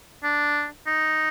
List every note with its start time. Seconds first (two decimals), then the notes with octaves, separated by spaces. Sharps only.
0.23 D4
0.87 D#4